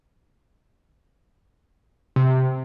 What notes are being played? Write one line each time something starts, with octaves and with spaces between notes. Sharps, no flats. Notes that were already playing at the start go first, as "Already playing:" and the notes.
C3